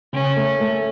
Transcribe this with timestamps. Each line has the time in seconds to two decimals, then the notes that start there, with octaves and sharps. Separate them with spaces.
0.13 C#3 C#4
0.36 A3
0.61 A3